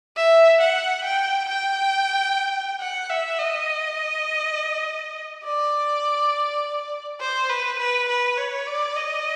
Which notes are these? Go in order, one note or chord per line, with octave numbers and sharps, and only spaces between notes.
E5
F#5
G5
G5
F#5
E5
D#5
D5
C5
B4
B4
B4
C#5
D5
D#5